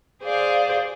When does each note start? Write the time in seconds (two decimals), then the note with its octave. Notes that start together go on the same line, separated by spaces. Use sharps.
0.23 G#4 C5 D5 F5